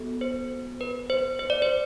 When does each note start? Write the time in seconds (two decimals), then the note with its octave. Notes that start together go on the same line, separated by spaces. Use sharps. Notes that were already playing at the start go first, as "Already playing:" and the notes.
Already playing: B3 F#4 A4
0.21 C5
0.81 B4
1.10 C5
1.39 C5
1.50 D5
1.62 C5